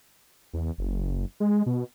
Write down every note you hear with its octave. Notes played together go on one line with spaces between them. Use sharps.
E2
F#1
G#3
B2